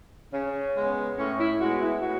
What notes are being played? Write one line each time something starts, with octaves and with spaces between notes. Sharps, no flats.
C#3 C#4
G#3 B3
A2 C#4
E4
G#3 B3 F#4
E4
A2 F#4